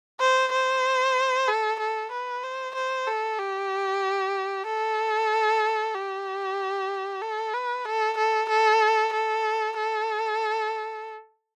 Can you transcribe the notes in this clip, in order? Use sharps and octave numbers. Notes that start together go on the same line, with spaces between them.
C5
C5
A4
A4
B4
C5
C5
A4
G4
A4
G4
A4
B4
A4
A4
A4
A4
A4